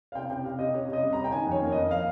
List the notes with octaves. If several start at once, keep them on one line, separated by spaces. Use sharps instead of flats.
F5
C3 G5
C3 G5
C3 F5
C3 D#5
C3 C#5
C3
D#5
G3
C3 A#5
G5
D#3 G#5
F2 C#5
A#3
F2 D#5
F5